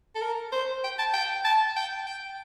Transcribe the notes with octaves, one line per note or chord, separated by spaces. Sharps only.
A4
A#4
C5
G5
A5
G5
A5
G5
G5